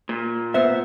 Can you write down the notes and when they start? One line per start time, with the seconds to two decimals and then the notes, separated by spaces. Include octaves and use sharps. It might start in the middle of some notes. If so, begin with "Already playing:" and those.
0.09 A#2
0.54 B3 C5 E5